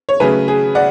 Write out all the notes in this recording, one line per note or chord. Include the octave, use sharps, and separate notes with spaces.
C#5
C#3 F#3 A3 G#4 B4
G#4
D5 F#5